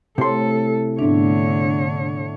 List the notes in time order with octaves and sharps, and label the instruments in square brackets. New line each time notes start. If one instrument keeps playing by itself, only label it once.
[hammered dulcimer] A2 [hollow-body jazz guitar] C3 C6 [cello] A4
[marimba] G#2 B3 D4 [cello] D3 C#5 [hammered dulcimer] A3 E5